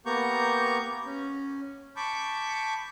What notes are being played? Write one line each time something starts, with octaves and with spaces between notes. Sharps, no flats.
A#3 B3 G4 A#5 C#6 G6
C#4
A5 B5 C#6 D6 G6